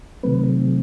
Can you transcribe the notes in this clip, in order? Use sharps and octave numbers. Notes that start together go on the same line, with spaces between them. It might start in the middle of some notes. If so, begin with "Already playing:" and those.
C3 D#3 F#3 A3 C4 B4